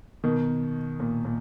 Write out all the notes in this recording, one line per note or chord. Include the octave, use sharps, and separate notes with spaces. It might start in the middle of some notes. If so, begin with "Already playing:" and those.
B2 D#3
A#2
A#2